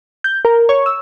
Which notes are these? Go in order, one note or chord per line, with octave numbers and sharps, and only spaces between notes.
G6
A#4
C#5
E6